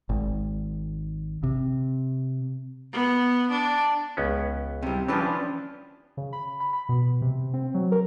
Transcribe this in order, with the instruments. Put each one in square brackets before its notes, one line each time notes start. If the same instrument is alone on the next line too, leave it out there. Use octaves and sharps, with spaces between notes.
[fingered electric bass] G#1
C3
[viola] B3
D4
[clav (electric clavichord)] C#2 B3 C#4
[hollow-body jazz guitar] C3 G3
[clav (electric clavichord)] E3 F3 [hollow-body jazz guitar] C#4 D4 B4
[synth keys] C#3
B5
B5
B5
B2
C3
C4
F#3
A#4